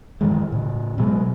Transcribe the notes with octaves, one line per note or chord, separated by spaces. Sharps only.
G2 D#3 E3 G#3
A2 C#3
B2 F#3 G#3